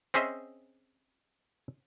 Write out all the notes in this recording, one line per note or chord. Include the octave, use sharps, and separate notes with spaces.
C4 C#4 G#4 C5 D#5 E5